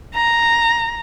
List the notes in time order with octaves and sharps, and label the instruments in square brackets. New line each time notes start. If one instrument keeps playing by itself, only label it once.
[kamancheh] A#5